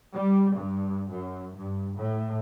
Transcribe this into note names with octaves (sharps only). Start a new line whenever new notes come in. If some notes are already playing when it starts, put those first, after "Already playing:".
G3
G2
F#2
G2
A2